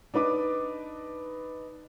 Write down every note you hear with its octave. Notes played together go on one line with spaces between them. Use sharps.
D4 D#4 B4 D6